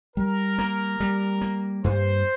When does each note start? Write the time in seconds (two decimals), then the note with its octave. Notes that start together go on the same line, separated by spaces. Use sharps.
0.16 G3 A#4
0.59 A#3
1.00 G3
1.41 A#3
1.84 G2 C5